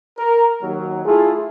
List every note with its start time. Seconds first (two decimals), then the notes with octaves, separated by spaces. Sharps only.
0.18 A#4
0.62 D#2 F#3
1.05 A3 E4 F4 G#4